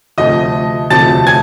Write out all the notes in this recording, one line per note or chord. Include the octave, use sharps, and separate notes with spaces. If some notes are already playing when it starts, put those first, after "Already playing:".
D2 C3 F3 A3 D#5 D#6
D2 C3 F3 A3 A5 A6
G#5 G#6